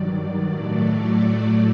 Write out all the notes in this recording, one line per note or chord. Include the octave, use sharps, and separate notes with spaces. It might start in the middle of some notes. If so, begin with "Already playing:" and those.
Already playing: G2 D#3 F#3 D5
A2 F#3 A3